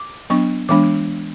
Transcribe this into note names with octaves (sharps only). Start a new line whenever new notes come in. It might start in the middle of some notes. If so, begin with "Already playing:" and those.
Already playing: D6
F#3 B3 D4 C#6
E3 G#3 B3 D4 D6